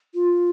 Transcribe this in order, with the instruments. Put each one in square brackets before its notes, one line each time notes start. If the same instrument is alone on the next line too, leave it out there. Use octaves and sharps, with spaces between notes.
[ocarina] F4